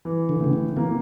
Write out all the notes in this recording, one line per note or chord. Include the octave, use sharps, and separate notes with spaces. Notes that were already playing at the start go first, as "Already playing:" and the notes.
E3
D3
A2 C#3
D3
E3 A#3